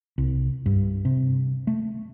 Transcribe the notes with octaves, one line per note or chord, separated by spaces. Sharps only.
C2
G2
C3
A3